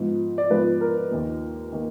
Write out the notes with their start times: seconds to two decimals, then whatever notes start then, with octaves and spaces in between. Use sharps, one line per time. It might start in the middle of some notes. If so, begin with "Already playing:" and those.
Already playing: G#2 F3 B3
0.38 D5
0.50 G#2 F3 B3 B4
0.81 A#4
1.11 D#2 D#3 A#3
1.72 D#3 A#3